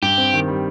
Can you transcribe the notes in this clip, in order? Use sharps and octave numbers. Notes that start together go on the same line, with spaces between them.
G2 G4
C4
D#3
G3